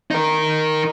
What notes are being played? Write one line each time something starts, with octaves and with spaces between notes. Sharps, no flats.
D#4 A#4